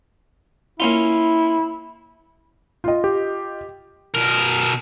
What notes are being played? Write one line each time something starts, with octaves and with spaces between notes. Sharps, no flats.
A#3 C#4 E4 F4
F4 D#5
G4
B2 A#4